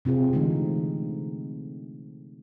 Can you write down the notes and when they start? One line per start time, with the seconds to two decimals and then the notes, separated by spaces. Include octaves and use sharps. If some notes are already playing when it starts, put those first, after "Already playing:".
0.05 C3 C4 F4 G#4
0.33 D3 E3 G#3 A3 D#4